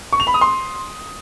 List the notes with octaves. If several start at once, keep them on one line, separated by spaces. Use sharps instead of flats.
C#6
F7
B5
D#6
C6